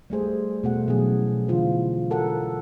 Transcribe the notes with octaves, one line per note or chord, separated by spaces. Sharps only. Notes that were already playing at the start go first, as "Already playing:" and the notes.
G3 A3 G#4 C5
B2 A3 F#5
B2 E3 F#3 C#4 G#4
D3 E3 F4 C5
F#4 A4 A#4 F#5